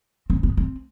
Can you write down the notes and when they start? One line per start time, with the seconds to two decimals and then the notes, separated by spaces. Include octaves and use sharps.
0.30 C4
0.43 B3
0.57 C4